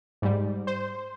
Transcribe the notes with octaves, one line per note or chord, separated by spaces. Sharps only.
G#2 G3
C5